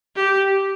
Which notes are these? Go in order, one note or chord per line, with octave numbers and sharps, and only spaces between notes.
G4